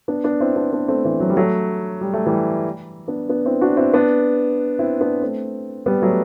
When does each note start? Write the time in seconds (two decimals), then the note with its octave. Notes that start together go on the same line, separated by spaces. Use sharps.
0.08 B3 D4
0.24 B3 D4
0.40 C4 E4
0.56 B3 D4
0.72 B3 D4
0.88 A3 C4
1.05 E3
1.20 F#3
1.30 G3
1.37 F#3 A3
2.01 G3
2.13 A3
2.27 E3 G3
3.08 B3 D4
3.29 B3 D4
3.45 C4 E4
3.61 D4 F#4
3.77 C4 E4
3.94 B3 D4
4.79 C4 E4
5.00 B3 D4
5.22 A3 C4
5.86 G3 B3
6.02 F#3 A3